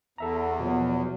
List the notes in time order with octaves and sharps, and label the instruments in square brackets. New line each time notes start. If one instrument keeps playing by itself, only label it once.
[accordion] E2 [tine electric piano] A4 E5 A#5
[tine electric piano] B2 F3 F#3